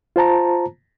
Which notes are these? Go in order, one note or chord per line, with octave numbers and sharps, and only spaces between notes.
F4 C5 A5 A#5